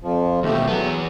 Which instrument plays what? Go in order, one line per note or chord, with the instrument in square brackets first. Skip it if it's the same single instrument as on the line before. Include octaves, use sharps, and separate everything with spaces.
[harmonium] F2 F3
[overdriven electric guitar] D#2 B2 [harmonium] A3 G4
[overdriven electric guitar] E2 B3 [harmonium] F#3